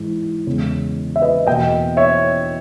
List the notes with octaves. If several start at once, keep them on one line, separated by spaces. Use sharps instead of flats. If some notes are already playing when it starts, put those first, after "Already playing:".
Already playing: G#2 E3 G#3
E2 C#3 G#3
E5
B4 D#5
E2 B2 A#3 D#5 G5
C#5 E5